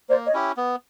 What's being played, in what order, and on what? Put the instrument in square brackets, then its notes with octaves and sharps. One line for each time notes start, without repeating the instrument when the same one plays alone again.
[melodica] A#3 [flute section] C5 D5
[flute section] C#5 D#5
[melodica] C#4 E4 G4
B3